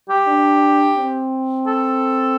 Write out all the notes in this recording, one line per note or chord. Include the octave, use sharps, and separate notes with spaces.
G4
D4
C4
A4